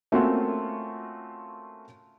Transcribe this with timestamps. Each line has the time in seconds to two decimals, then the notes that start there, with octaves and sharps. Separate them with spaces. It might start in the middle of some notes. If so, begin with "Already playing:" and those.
0.12 A3 A#3 C4 C#4 F4 F#4